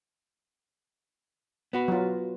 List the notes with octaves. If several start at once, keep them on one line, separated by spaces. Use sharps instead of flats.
B3 F#4 B4
F#3 F4